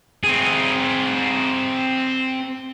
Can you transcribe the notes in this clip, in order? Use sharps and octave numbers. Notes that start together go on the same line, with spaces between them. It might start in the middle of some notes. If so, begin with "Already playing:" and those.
C4 G#4